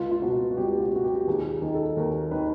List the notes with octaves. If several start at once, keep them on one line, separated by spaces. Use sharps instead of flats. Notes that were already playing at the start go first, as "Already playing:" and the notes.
Already playing: C#2 F4
F4
B2 F#4
F#4
C#2 G4
G4
F#4
B2 F#4
G4
G4
D#2 G#4
G#4
D#3
A4
D#2 A#4
D#3 B4